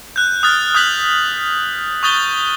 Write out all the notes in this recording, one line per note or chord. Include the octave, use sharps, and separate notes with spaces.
F#6 G6
D#6 F6 F#6 A6
D#6 F#6 G6 B6 F#7
C#6 D#6 G6 A6 G7